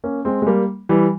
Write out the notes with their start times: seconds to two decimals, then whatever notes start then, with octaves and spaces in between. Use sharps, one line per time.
0.04 A#3 C#4
0.25 G#3 C4
0.42 G#3
0.47 G3 A#3
0.89 E3 G3